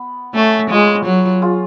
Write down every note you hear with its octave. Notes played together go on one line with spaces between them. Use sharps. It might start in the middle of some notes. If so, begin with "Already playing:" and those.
Already playing: B3
A3 C#4
G#3 F4 G#4
F#3
F4 G#4